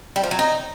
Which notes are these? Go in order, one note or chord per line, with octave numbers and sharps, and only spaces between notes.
G3
F3
F#3
D#4